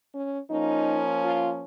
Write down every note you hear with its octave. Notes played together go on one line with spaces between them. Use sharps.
C#4
F3 A#3 C#4 D#4
F4